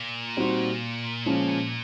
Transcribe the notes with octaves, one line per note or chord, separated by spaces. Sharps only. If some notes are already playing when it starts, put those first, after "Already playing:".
Already playing: A#2
G3 C4 D#4 F#4
C#3 F3 G#3 C#4